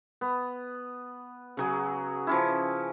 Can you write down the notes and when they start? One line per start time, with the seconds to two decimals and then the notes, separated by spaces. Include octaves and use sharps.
0.21 B3
1.57 C#3 F#3 G#4
2.27 F3 C#4 E4